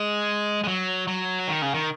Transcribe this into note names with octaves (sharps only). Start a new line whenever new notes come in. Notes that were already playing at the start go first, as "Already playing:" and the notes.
Already playing: G#3
G#3
F#3
F#3
D#3
C#3
D#3